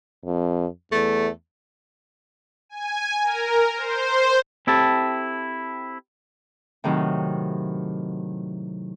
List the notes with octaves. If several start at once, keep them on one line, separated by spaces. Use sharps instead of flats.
F2
E2 A3
G#5
A#4
C5
C4 E4 G4 A4 A5
A2 C3 D#3 F#3